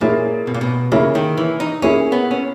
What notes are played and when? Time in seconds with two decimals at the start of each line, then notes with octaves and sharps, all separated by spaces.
0.01 A#2 A#3 E4 G#4 C#5
0.47 B2
0.54 A#2
0.61 B2
0.92 C#3 A#3 E4 G#4 C#5
1.15 D#3
1.38 E3
1.60 D#4
1.82 A#3 C#4 E4 G#4 C#5
2.12 B3
2.31 C#4